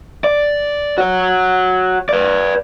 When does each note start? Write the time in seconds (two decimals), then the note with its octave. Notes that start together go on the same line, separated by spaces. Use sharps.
0.24 D5
0.98 F#4 C#5
2.09 B4 D5